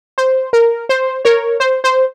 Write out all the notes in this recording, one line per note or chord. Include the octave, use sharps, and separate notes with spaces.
C5
A#4
C5
A#4 C#5
C5
C5